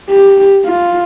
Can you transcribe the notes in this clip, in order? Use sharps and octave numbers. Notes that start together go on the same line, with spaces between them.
G4
F4